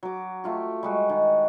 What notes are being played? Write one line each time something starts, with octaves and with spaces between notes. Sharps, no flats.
F#3 D6
A3 F4 G4
G3 G#3 F#4
D#3